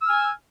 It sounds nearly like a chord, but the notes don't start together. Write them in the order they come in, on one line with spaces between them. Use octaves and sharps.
E6 F6 G#5